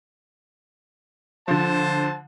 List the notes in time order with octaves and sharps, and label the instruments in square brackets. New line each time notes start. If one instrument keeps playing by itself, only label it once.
[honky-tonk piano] D3 F3 [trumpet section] C5 A5